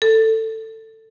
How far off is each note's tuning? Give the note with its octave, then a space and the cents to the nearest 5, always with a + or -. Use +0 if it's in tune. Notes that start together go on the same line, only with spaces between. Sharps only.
A4 +15